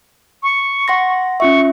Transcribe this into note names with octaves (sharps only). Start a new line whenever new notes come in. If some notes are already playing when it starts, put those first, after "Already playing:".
C#6
F#5 C6 A#6
C#4 F4 E5 C#6